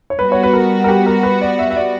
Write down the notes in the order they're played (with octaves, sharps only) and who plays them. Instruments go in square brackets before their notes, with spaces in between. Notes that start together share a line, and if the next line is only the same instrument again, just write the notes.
[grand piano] C#5
[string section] G3 B3 F#4 [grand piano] B4
[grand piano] C#5
B4
A#4
A#4
G4
A#4
B4
D5
E5
E5
D5